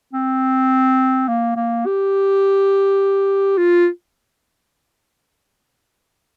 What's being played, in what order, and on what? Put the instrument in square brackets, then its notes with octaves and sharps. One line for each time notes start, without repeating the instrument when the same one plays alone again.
[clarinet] C4
A#3
A#3
G4
F4